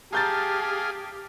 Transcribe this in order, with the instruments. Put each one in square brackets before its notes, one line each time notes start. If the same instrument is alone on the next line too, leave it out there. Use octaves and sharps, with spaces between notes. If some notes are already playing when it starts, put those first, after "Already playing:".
[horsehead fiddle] G4 [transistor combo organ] G#4 F5 [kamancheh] A5 [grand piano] A#5 G6 A6